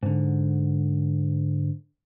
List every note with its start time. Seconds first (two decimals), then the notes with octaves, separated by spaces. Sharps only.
0.03 G#2 D3